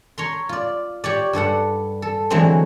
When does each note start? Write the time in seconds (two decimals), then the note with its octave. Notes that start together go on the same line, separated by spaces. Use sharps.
0.18 C#5 A#5 C6
0.49 F4 D5
1.04 G4 C#5 D5
1.33 G2 G3 A4 F#5
2.02 A4
2.30 D3 E3 F#3 G#3 B3 C4